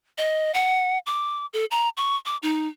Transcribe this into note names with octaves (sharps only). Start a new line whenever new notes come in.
D#5
F#5
D6
A4
A#5
C#6
D6
D#4